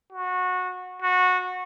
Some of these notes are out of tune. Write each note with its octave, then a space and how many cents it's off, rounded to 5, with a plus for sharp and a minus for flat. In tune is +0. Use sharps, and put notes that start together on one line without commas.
F#4 -20
F#4 -20